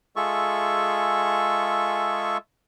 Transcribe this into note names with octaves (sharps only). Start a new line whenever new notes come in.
G#3 F4 G#4 A4 E5 C#6